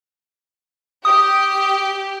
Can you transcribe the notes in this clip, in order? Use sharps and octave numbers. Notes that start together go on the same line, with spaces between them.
G4 D#6